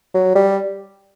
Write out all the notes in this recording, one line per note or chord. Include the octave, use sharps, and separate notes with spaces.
F#3
G3